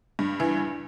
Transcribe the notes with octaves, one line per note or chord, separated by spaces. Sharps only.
G2
E3